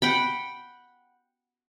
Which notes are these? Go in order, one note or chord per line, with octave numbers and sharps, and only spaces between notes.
F#5 G5 B5